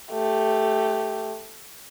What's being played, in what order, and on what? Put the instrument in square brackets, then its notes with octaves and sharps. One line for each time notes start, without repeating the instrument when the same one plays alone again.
[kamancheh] A3 G4